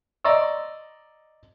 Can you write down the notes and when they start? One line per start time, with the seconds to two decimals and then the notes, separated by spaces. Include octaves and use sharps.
0.24 D5 D#5 A#5 C6 C#6 E6